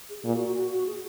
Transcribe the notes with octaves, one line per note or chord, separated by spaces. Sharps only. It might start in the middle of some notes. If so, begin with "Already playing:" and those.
G#4
A#2 G#4
F#4
F#4
F#4
F#4
G#4